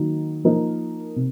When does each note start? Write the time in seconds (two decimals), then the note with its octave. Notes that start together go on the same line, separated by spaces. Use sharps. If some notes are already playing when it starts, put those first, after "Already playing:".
Already playing: D#3 F#3 A#3 D#4
0.44 F3 A#3 D#4 A#4
1.16 C3